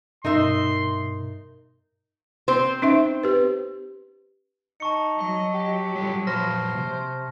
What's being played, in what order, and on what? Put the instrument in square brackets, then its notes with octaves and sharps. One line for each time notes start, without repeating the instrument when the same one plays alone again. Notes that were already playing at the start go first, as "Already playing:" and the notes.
[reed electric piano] G2 B2 [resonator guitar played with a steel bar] D#4 A#4 E5 [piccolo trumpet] C6
[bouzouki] C4 C5
[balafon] C#4 D#4 E5
G4 B4
[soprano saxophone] D#4 [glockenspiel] A5 C#6 C#7
[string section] F#3 [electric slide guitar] D#5
[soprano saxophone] G4
[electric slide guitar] G3 F4 A4
[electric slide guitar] A#2 F3 B4 [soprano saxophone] C5 [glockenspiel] A5 F6 A#6
[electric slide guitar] C3